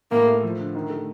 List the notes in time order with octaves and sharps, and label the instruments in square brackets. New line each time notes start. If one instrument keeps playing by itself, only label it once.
[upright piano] A2 [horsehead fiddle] A#3
[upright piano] A3
F3
D3
D#3
A3